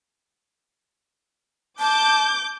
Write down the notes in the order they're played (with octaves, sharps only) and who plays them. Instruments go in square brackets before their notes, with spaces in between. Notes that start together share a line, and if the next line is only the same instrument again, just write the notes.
[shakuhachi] A5 [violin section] D6 G6